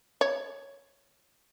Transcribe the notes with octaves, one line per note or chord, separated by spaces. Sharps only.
C#5